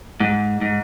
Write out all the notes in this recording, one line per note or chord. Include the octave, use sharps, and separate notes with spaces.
G#2
G#2